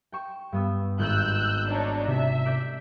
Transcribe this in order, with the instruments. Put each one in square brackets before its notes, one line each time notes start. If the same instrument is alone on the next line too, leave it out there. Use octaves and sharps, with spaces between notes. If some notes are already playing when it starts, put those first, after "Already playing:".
[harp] G5 C#6 E7
G2 B3 E6
[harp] G#1 [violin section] E6 F#6 G6
[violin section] D4 D#4 C#5
[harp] C3 [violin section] E5
[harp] D5 G6 B6